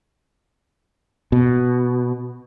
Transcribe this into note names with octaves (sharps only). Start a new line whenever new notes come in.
B2